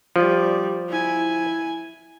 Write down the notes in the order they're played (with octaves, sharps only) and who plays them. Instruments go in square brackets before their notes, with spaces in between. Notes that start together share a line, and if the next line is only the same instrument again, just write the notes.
[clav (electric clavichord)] F3 [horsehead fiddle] G3 D5
[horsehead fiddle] E4 G#5